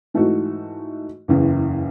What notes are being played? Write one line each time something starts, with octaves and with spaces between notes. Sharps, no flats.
G#2 E3 A3 D#4 F#4
F#1 E2 C#3